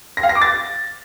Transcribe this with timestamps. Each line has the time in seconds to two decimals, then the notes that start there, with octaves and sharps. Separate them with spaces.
0.17 A#6
0.23 F5
0.29 A#6
0.35 D6
0.42 A6